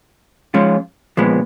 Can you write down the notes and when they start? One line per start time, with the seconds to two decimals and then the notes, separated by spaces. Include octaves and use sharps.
0.54 F3 G#3 C#4 F4
1.17 A#2 F3 G#3 B3